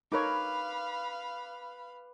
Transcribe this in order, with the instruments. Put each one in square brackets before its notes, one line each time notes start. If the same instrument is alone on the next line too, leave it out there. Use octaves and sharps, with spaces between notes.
[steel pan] D#4 A#4 C#5 [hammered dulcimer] B4 D6 [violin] F5 B5